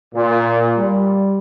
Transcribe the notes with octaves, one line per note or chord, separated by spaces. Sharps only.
A#2
G3